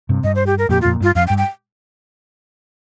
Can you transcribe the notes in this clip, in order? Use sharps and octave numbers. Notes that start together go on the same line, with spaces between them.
G2 C3
G2 D#5
C5
G4
A#4
F2 A#2 G4
F4
F2 A#2
G2 F4
F2 F5
G5
G2
G5